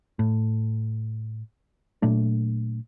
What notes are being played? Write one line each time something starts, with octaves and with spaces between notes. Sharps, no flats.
A2
A#2 F#3 A3 D4